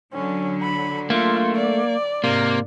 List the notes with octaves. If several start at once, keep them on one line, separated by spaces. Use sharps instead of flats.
D3 F#3 C#4
B5
A3 A#3 F4
D5
G#2 C3 A#3